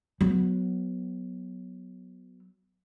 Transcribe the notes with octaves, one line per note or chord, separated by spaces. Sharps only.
F#3 B3